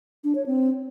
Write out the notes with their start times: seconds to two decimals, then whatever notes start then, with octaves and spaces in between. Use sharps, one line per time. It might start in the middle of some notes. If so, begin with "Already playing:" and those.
0.24 D4
0.35 C#5
0.46 C4